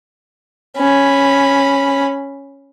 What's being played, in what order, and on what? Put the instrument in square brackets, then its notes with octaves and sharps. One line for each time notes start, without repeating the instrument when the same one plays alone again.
[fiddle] C#4 B5